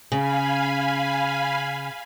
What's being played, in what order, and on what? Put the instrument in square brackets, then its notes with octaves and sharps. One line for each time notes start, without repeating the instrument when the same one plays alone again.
[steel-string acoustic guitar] C#3 [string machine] F5 G#5 B5